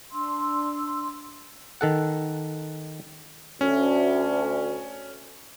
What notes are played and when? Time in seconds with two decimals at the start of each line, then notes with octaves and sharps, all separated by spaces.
0.12 D4 C6 E6
1.81 D#3 A4 F#5
3.61 D2 C#4